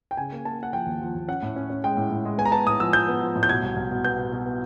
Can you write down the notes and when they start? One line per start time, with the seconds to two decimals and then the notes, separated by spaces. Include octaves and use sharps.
0.11 G5
0.17 C#3 G#5
0.32 A#3
0.45 A#3 A5
0.59 A#3 F#5
0.73 F3 G5
0.86 D#2
1.01 F3
1.14 D#2
1.28 C#4 F#5
1.43 A2
1.56 C#4
1.70 C#4
1.84 G#3 G5
1.97 A2
2.10 A2
2.25 G#3
2.38 B3 G#5
2.46 A#5
2.52 B3 A5
2.67 A2 D#6
2.80 F3 E6
2.93 F3 G6
3.08 B3
3.21 F3
3.36 A2
3.43 G6
3.49 B2 G#6
3.63 C2
3.76 C2
3.91 B2
4.04 B3 G6
4.18 B2
4.32 B2
4.46 B3